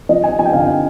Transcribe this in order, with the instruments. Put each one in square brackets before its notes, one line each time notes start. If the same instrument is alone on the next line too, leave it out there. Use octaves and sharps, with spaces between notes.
[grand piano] F3 D#5
F3 G#5
F3 G#5
G5
D3 F5
G5